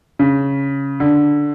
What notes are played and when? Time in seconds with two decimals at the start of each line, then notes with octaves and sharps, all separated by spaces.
0.19 C#3
1.00 D3